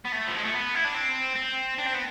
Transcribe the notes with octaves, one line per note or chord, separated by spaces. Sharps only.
B3
A3
F3
G#3
A3
B3
E4
D4
C4
C4
D4
C4
B3